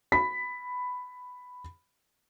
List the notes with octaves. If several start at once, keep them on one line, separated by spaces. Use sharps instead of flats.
B5 B6